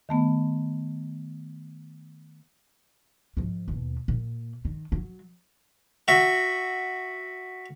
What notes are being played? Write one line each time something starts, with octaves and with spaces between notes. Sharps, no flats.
D#3 A3 B3
G#2 F3
D#2 B2
A#2
D#3
F#3
F#4 E5